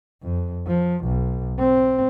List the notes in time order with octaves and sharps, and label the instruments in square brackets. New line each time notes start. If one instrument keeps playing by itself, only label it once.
[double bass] F2
F3
B1
C4